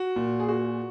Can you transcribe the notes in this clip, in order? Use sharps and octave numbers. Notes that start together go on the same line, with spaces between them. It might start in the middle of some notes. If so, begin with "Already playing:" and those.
Already playing: F#4
A#2
G#4
F#4